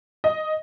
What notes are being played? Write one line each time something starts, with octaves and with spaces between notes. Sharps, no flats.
D#5